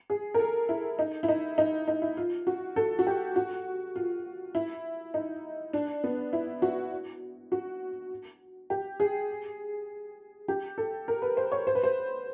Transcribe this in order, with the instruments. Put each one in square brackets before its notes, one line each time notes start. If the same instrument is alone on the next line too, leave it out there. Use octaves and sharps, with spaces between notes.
[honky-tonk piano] G#4
A#4
A4
E4
D#4
E4
D#4
D#4
D#4
E4
F4
F#4
A4
F#4
G4
F#4
F4
E4
D#4
D4
B3
E4
F#4
F#4
G4
G#4
G4
A4
A#4
B4
C5
C#5
C5
B4
C5